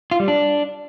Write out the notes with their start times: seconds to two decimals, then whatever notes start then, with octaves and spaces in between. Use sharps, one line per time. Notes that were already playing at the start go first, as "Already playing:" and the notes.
0.11 F4
0.20 G3
0.28 D4